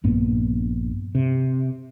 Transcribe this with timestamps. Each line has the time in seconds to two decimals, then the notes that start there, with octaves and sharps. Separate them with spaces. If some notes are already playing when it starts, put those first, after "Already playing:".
0.04 A#1 G2 A#3 B3
1.15 C3